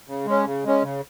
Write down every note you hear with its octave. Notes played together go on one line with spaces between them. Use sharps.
C#3
G#3 C#4
C#3
G#3 C#4
C#3